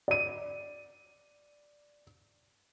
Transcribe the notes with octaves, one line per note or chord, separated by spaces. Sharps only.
D5 D#7